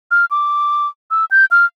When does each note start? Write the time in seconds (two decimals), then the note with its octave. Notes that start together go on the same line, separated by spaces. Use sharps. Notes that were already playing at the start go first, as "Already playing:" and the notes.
0.11 F6
0.31 D6
1.11 E6
1.31 G6
1.51 F6